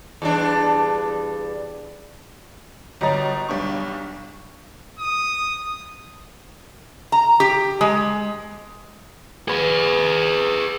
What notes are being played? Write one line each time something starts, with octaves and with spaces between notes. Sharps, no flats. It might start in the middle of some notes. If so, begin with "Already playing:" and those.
E2 G2 D4
G1 F#3 D#5 A#5 A6
B1 G3 D4 C#6
D#6
A#5
G4
G#3
G#4 B4